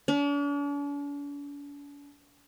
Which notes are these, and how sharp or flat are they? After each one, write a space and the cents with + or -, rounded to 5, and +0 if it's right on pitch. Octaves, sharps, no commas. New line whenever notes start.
D4 -45